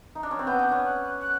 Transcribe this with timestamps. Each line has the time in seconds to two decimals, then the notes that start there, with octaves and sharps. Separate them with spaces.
0.15 D#4
0.23 D4
0.31 C#4
0.39 C4 F#6
0.46 B3 G6
0.59 D4
0.72 C#4
0.85 F#6
1.21 F#6